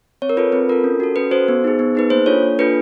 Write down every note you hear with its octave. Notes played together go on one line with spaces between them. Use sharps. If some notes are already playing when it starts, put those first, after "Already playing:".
C4 C#5
A#4
F4 A4 B4
C4 B4
F4 A4 A#4
C#4
F#4 A4
C#4 B4
F#4 A4 C5
B3
D#4 G#4
B3
D#4 G#4 B4
A#3 C5
D4 F4 A4 C#5
A#3
D4 F4 A4 B4